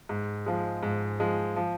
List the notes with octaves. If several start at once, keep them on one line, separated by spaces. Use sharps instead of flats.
G#2
F3 G#3
G#2
F3 G#3
F3